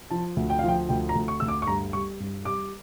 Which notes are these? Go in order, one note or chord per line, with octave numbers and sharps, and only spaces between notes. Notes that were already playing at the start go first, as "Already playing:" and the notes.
F3 A5
D2
G5
F5
F3 G5
D2 G5
A#5
D2
C#6
D2 E6
D6
C#6
G2 A#5
G3 C#6
G2
G3 D6